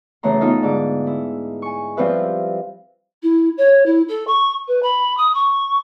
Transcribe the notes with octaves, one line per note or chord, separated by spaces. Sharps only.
F#2 C#3 E3 A3 A#5 C6
B3 D#4 F4 A4
G#2 D3 D6
E4
G#5 C#6
F3 G3 C4 F4 B4 E5
E4
C#5
E4
A4
C#6
B4
B5
D#6
C#6